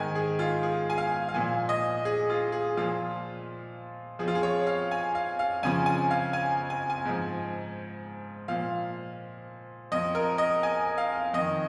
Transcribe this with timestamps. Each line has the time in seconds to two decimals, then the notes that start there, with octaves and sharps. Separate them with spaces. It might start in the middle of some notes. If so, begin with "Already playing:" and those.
Already playing: G#2 D#3 G#5
0.15 G#4
0.39 F4
0.63 G#4
0.90 G#5
0.98 F5
1.29 F5
1.34 A#2 F3 G#5
1.69 D#5
2.05 G#4
2.30 F4
2.52 G#4
2.77 A#2 F3 F4
4.19 F3 G#4
4.23 F2 F4
4.35 G#4
4.43 C#5
4.67 F5
4.91 G#5
5.15 F5
5.39 F5
5.63 F2 C#3 F3 G#5
5.86 G#5
6.11 F5
6.33 G#5
6.70 G#5
6.90 G#5
7.05 G#2 F3
8.48 A#2 F3 F5
9.92 F2 F3 D#5
10.15 A#4
10.38 D#5
10.63 G#5
10.98 F5
11.33 F2 D#3 D#5